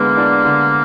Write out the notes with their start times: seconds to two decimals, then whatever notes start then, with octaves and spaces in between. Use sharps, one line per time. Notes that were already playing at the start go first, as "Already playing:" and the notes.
Already playing: D3 G#3 A#3 B3
0.17 D4
0.45 D3